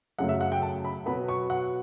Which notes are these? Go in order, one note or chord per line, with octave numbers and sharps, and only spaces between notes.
F#2 C#3 F#3 A3 F#5
E5
F#5
G5
A5
B5
B2 F#3 B3 B5
C#6
F#5